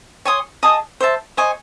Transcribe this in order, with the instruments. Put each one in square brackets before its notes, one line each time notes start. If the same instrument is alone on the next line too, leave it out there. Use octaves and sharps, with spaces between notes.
[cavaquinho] C#5 G#5 C6 D#6
G#4 D#5 A5 D#6
C5 E5 A5
C5 D#5 G#5 C#6